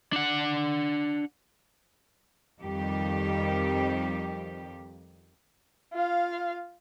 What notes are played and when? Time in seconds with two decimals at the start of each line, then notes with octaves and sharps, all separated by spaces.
0.13 D4 F#5
2.61 F2 D#3 F3 G3 G4
5.93 F4 F5